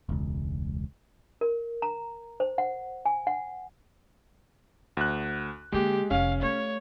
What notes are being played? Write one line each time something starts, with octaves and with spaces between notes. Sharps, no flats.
E1 C#2
A#4
A#5
C5
F#5
G#5
F#5
D2 F#6
D3 G#3 A#3 G4
F1 C#4 F5
A3 C#5